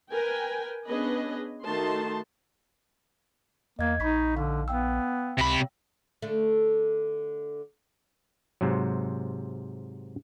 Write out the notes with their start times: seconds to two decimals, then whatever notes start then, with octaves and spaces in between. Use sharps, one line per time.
0.12 A#4 B4 G5 G#5
0.88 B3 C#4 D4 G#4 B4 D#5
1.64 D#3 A3 D#4 F#4 A5 C6
3.79 E2 A#3 D#5 G#6
4.00 A#1 D#4 B5 C#6 B6
4.36 D3 D#4 F5
4.68 B3 F5 G5 E6
5.38 C#2 C3 B5
6.22 D3 A3
8.61 G#2 C3 F#3